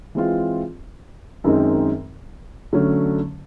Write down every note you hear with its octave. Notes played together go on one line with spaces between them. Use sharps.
E3 G#3 C4 F4
F#2 D#3 G#3 C4 D#4
D3 F#3 A3 C#4